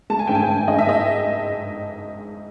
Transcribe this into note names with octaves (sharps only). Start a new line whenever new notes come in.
G#3 A5
G#5
G#2 G5
G#5
G#2
G#2 D#5
E5
G#3 D#5